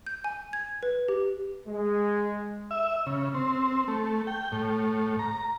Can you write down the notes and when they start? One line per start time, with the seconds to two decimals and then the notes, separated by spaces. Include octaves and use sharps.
0.07 G6
0.24 G#5
0.53 G#6
0.83 B4
1.08 G4
1.67 G#3
2.71 E5
3.06 C#3
3.34 C4
3.88 A3
4.27 G5
4.52 A2
5.19 A#5